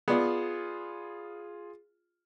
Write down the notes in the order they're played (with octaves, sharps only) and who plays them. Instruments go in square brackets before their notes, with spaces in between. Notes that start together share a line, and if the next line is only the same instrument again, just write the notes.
[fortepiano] B3 D5 [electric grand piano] F4 G#4